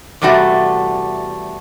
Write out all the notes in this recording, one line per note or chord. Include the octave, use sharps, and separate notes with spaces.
E2 C3 G3 A3 F#4